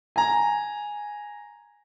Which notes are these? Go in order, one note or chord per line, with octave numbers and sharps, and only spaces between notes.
G#5 A#5